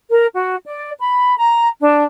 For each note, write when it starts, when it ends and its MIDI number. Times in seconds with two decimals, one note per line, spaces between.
0.10 0.26 70
0.36 0.56 66
0.66 0.91 74
0.99 1.36 83
1.37 1.68 82
1.79 2.03 62